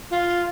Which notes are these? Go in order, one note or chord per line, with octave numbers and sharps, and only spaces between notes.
F4